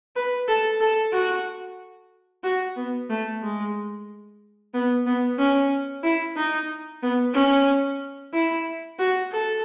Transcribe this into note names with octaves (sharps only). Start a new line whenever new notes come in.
B4
A4
A4
F#4
F#4
B3
A3
G#3
B3
B3
C#4
E4
D#4
B3
C#4
E4
F#4
A4